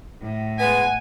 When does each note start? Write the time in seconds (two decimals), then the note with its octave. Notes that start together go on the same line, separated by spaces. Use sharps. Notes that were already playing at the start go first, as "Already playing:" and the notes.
0.22 A2
0.59 G#3 B3 F#5 G#5